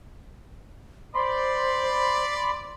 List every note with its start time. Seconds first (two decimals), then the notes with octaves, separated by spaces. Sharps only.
1.15 C5 D5 B5 C6